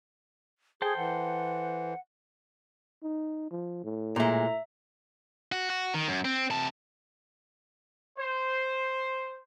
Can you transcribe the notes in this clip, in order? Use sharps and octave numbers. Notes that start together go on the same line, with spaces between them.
G#4 A4 C5 G5
E3 F#5
D#4
F3
A2
A#2 G#3 E5 A#5
F#4
F#4
D#3
F#2
C4
C3 A5
C5